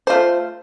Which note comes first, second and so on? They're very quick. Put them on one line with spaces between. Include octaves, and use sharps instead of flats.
C5 F4 A3